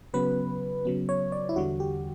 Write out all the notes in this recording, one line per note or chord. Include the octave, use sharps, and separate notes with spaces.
C#3 F#3 B3 B4
C#3 F#3 B3
C#5
D5
E4
E2 D3 G3 F#4
G4